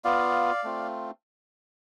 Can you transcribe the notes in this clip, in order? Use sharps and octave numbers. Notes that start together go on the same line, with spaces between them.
B3 F4 D5 F5
A3 C4 F4